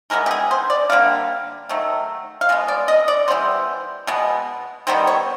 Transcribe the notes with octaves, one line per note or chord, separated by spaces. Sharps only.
E3 G#3 B3 A#4
G4
G#4
C5
D5
D3 G3 A#3 F5
D#3 F#3 A3
F5
B2 G#3 B3
D5
D#5
D5
E3 G3 B3 C5
B2 G#3 B3
D#3 G3 B3 C5
C#5